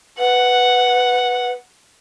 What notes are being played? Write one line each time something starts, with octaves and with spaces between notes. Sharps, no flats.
B4 F#5